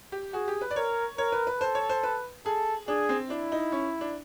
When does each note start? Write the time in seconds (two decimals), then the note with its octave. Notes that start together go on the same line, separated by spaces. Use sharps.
0.12 G4
0.33 F#4 G#4
0.48 G4
0.61 B4
0.71 D5
0.76 A#4 C#5
1.18 A#4 C#5
1.32 B4
1.47 B4
1.60 A4 C5
1.75 C#5
1.89 C5
2.03 B4
2.46 G#4 A4
2.88 D4 G#4
3.09 C4
3.30 D4 E4
3.52 D#4
3.72 C#4
4.01 D4